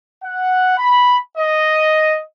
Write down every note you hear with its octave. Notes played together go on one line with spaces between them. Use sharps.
F#5
B5
D#5